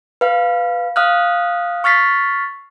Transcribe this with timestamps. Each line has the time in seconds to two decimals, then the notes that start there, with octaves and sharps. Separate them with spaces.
0.21 B4 F5
0.96 F5 D#6 F6 F#6
1.84 C#6 F6 A6 B6 C7